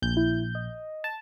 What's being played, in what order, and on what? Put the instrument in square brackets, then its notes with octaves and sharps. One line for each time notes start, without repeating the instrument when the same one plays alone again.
[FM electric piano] A#1 G6
[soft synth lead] E4
D#5
[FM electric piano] A5